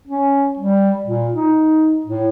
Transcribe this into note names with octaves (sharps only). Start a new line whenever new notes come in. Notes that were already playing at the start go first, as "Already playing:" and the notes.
C#4
G3
A#2
D#4
A2